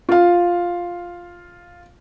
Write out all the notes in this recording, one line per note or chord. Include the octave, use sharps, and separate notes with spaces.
F4 F5